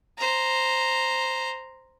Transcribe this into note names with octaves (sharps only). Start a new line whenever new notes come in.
C5 A#5